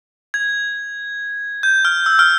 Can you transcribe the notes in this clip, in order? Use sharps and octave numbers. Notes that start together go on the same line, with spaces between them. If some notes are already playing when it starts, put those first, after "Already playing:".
G#6
G6
F6
E6
F6